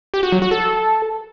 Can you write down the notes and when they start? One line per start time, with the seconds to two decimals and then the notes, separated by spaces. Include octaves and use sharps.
0.14 G4
0.23 F#4
0.32 F#3
0.42 F#4
0.51 A4